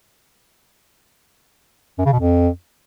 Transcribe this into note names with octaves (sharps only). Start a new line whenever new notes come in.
F#2
C#3
B2
F2